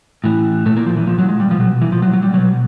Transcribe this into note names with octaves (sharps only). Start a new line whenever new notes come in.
A2 E3
A#2 A3
A#3
F3
E3
A#2 F3
F#3
G#3
G3
B2 F3
F#3
E3
A#2 F3
F#3
F#3
G3
B2 F#3